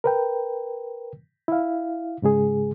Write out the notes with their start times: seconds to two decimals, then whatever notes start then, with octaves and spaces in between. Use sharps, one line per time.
0.04 A#4 B4 G5
1.48 E4 F5
2.22 G#2 C#3 G#3 G#4